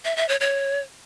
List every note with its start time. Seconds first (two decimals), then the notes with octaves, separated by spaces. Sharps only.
0.05 E5
0.17 E5
0.29 C#5
0.41 C#5